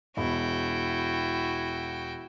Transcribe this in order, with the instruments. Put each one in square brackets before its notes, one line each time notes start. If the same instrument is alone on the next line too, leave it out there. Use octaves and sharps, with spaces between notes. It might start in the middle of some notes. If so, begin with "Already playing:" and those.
[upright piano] E1 B5 [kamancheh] E4 [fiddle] F#4 G5